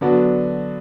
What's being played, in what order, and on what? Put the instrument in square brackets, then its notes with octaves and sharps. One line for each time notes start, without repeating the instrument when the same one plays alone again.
[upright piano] D3 F#3 B3 D4 F#4